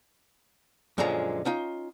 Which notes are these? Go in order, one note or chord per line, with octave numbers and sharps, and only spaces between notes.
F#2 A#2 D3 F3 G#3 A#5
C#4 D#4 F4